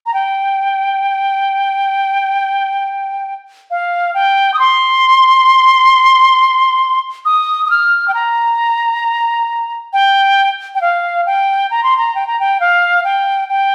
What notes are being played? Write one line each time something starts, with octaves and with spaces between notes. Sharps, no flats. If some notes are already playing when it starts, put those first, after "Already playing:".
A#5
G5
F5
G5
D#6
C6
D#6
D#6
F6
G5
A#5
G5
G5
F5
G5
A#5
C6
A#5
G5
A#5
G5
F5
G5
G5